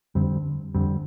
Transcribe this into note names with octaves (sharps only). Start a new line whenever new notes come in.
F2 D3 G3 C4
F2 D3 G3 C4